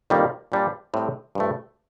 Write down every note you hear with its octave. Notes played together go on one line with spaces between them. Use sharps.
F2 D#3 G3 A#3
A#2 G3 D4 F4
A2 G3 C4
G2 F3 A3